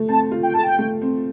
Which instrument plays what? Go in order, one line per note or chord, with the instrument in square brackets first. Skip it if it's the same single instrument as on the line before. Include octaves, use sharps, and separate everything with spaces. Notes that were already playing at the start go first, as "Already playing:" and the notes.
Already playing: [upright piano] A3
[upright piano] C4 [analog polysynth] A5
[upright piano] F4
[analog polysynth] G5
[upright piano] A4 [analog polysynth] A5
[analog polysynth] G5
[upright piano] A3
C4